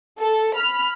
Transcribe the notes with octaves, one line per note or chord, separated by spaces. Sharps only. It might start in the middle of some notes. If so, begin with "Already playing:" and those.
A4
B5 F6